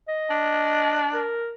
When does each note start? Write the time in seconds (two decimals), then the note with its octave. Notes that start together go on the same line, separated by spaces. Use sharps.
0.08 D#5
0.30 D4
1.14 A#4